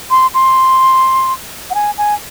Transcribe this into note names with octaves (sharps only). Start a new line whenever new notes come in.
C6
C6
F#5
G#5
G#5